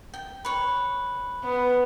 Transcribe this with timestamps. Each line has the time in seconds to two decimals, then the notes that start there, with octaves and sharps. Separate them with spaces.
0.14 G5
0.45 B4 C#5
1.44 B3